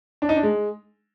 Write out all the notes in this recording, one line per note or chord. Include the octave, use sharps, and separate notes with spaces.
D4
D#4
D4
G#3